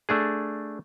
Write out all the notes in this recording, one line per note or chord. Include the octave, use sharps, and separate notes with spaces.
A3 D4 G#4